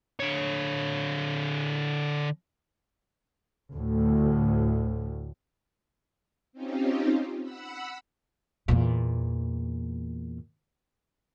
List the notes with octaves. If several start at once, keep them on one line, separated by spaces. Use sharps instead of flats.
D3 C#5
D2 A2
C4 C#4 D#4 F4 G4
F#5 B5 E6
E2 A#2